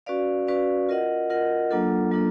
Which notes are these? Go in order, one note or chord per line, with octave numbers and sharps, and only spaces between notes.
C#4 F#4 B4 D5 F5
C#4 F#4 B4 D5 F5
F4 A#4 D#5 F#5
F4 A#4 D#5 F#5
F#3 A#3 D4 F4 A4
F#3 A#3 D4 F4 A4